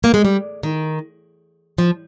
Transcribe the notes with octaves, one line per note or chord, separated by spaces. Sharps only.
A#3
G#3
G3
D#3
F3